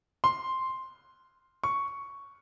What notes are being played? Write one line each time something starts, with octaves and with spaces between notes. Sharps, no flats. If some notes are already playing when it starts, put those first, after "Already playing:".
C6
C#6